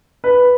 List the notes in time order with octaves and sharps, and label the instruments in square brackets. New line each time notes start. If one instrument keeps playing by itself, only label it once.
[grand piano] B4